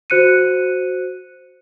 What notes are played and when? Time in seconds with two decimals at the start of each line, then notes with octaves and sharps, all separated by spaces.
0.10 F#4 C5 F#6 C#7 D#7